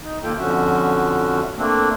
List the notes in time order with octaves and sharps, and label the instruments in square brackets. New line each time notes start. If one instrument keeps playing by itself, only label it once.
[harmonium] D#4
D#2 D#3 A#3 F4 A4 G5
F2 D3 F3 C#4 F#4 E5
A3 A#3 C4 D4